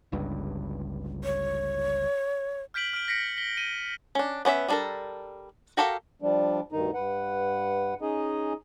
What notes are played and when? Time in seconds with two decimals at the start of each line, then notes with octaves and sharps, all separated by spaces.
0.12 G1 C#2 G2
1.24 C#5
2.74 F6 G6 B6 D7 F#7
2.93 F6 D7
3.08 A#6 B6 C#7 D7
3.37 B6 G7
3.57 D7 D#7 G7
4.15 C#4 D4
4.45 B3 C#4 D5 E5
4.68 G3 B3 D4 A4 A#4
5.77 F#4 G4 A4 A#4 F5
6.22 F3 G3 D4
6.72 D2 G2 D#3 D#4
6.94 G2 B4 F#5
8.01 C#4 D#4 G#4 D#5